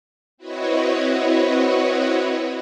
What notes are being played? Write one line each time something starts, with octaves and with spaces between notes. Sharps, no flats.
C4 E4 F#4 B4 C#5 D#5